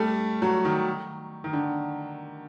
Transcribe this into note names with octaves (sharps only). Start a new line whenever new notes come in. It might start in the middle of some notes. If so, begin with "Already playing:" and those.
Already playing: G3 A3
F#3
D#3
D#3
D3